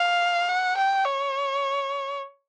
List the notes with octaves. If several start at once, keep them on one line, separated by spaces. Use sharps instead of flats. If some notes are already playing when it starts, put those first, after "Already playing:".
Already playing: F5
F#5
G5
C#5